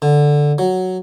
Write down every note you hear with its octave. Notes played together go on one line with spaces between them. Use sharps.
D3
F#3